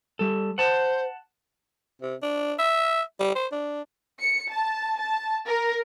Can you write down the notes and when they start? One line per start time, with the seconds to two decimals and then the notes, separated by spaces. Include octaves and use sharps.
0.19 G3 A4
0.58 C5 F#5 A5
2.02 C3
2.22 D4
2.59 E5
3.20 G3
3.35 C5
3.52 D4
4.20 C#7
4.51 A5
4.97 A5
5.47 A#4